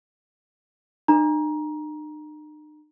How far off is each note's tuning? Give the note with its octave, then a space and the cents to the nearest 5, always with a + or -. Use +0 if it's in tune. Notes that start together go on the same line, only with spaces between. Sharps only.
D#4 -45 A#5 +20